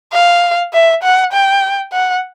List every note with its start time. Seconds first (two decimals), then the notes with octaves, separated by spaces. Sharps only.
0.13 F5
0.73 E5
1.03 F#5
1.33 G5
1.93 F#5